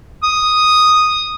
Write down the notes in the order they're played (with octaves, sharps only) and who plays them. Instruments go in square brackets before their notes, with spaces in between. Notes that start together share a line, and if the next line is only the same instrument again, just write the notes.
[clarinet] D#6